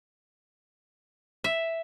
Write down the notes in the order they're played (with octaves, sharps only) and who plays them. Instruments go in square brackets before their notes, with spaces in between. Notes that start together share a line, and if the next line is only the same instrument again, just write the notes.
[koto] E5